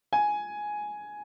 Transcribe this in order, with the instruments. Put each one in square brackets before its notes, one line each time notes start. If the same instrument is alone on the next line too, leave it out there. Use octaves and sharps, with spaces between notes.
[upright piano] G#5